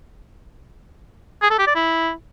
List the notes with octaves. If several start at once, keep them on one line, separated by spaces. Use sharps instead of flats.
G#4
A4
G4
D5
E4